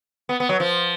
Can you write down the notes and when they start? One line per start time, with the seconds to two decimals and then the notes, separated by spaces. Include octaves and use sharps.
0.29 B3
0.40 B3
0.49 F#3
0.60 F3